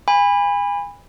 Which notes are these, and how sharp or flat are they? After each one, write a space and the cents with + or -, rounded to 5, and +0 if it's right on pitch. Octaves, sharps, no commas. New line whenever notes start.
G#5 -35 B5 +0